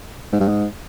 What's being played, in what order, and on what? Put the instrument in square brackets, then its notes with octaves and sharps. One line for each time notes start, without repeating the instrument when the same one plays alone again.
[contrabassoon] G#2
G2
G#2